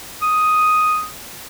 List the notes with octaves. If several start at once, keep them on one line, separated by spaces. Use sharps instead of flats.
D#6